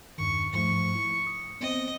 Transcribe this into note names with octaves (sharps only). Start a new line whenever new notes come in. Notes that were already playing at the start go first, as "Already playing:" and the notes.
E2 G2 D#3 C#6
G#2 F3 A3 C#6
E4
D#6
B3 C4 C5 D#5